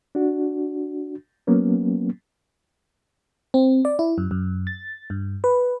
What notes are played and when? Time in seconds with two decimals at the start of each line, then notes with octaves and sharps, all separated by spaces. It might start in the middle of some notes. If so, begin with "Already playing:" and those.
0.15 D4 F#4
1.47 F#3 A#3 B3 C#4
3.54 C4
3.85 D5
3.99 E4
4.18 F#2
4.31 F#2
4.67 A6
5.10 G2
5.44 B4